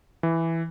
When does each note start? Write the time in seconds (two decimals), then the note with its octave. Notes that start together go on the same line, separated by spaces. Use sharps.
0.23 E3